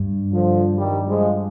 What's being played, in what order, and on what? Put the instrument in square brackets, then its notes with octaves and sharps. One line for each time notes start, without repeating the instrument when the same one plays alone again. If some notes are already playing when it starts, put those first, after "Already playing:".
Already playing: [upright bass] G2
[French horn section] D3 F3
D#3 G3
F3 G#3